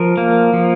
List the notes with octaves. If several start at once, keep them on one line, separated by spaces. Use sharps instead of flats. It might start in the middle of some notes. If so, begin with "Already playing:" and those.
Already playing: F3 A#4
A#3
F3